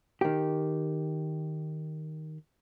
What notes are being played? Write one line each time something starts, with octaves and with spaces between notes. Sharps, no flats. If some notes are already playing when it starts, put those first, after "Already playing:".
D#3 G4